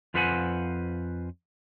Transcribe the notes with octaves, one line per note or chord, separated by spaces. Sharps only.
F2 F4 B4 C5 F#5 G#5